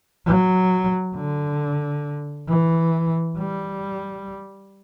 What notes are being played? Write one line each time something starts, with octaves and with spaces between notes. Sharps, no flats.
F#3
D3
E3
G3